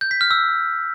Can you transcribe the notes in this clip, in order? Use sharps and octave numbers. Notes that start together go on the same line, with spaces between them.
G6
B6
F6
E6